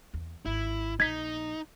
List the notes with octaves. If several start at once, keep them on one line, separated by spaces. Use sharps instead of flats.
E2
G#1 E4
A#1 D#4 G#6 B6